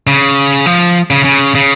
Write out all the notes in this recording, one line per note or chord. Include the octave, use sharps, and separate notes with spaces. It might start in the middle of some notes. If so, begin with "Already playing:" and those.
C#3
F3
C#3
C#3
C#3